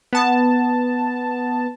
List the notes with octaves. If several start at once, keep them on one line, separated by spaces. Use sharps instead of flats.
B3 A5